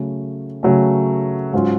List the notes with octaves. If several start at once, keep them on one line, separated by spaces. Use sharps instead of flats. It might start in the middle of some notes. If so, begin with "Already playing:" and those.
Already playing: C#3 F#3 A3
C#3 F#3 A3
G#2 F#3 C#4 F4